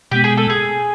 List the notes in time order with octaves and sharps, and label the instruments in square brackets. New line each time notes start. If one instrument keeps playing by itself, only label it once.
[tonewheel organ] B2 G#3 B3 [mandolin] G4
[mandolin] G#4
A4
G#4